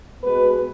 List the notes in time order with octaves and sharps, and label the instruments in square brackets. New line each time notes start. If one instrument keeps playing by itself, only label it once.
[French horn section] B2 G#3 B3 B4